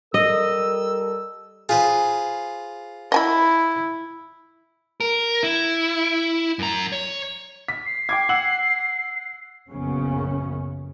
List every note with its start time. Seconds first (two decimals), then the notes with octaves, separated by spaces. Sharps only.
0.14 G3 A4 A#4 D#5 E6
1.69 F4 G#4 B4 C5
3.12 E4 D#5 G#5 B5
5.00 A#4
5.43 E4
6.59 F#2 A#5
6.92 C#5
7.68 B6
7.86 C7
8.09 G5 D6 G#6
8.29 F#5 E6 F#7
9.69 A#1 F#2 C#3 F3 B3 C#4